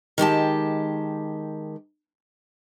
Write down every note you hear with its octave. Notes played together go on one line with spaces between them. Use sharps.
D#3 G#3 G4 A5